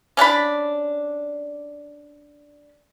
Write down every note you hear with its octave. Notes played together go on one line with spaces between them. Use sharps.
C#4 D4 G5 B5